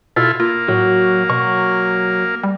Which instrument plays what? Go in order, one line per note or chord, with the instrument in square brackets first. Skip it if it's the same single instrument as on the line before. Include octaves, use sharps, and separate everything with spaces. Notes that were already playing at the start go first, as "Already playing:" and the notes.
[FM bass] B2 [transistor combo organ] E4 F4 A4
[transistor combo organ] A#3 [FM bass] F4
[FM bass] A2 [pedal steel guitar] F#3 F#4
[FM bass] B2 [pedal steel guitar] F#3 C#6
[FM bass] G3